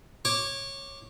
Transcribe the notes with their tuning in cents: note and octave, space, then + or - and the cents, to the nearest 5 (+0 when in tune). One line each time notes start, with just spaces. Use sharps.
C#5 -15 D6 +0